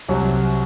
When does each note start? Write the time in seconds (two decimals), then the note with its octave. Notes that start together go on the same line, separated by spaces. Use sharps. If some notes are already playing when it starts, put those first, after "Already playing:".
0.08 C2 C3 F#3